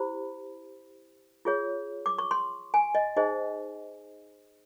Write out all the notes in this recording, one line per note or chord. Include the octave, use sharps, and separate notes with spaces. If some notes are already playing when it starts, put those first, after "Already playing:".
Already playing: E4 G4 C5 B5
F4 G#4 C#5
D6
C#6
C6
G#5
D#5
D#4 G#4 C5 D#5